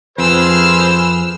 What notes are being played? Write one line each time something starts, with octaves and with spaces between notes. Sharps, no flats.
F2 G#4 B4 C5 E6 F6